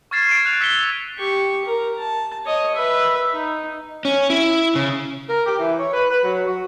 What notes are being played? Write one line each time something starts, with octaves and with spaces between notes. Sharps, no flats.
C#6 F6 G#6 A6 C7 E7
D7 D#7
F#6 F7
E6 B6 C#7 G7
G4 C#6
A#4
A5
C#5 D#5
B4 E5
D#4
C#4
E4
C#3
A#4
G4
E3
C#5
B4
B4
F#3
F#4